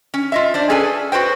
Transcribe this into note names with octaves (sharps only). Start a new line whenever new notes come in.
C#4
F4 D#5 E5
D4 C5 D5
C#4 G#4 A4 B4 G#5
F#4 B4 C5 G5